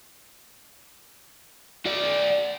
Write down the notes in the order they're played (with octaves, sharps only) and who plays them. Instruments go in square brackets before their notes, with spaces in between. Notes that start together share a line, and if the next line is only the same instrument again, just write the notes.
[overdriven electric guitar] F#4 D5